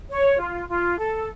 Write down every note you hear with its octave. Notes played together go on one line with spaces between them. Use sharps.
C#5
F4
F4
A4